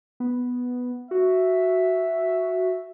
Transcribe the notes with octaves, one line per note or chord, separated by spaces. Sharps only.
B3
F#4 E5